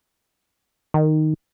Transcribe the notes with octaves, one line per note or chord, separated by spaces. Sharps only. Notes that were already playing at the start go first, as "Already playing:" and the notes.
D#3